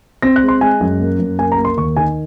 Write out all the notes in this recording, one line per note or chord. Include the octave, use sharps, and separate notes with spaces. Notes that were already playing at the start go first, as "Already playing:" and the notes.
C4 A#6
F#6
G#3
C6
G#3 G#5
F#2
A#3
F#2
A#3 G#5
A#5
A#3
C6
D#2 C#6
D#3 G#5